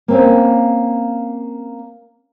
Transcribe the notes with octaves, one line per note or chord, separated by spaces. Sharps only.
A#3 C4 C#4